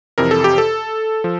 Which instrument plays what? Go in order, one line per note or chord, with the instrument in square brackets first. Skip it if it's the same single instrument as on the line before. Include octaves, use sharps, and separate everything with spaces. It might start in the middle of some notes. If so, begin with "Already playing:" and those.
[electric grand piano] F2 C3 E3 A#4
A4
G4
A4
F3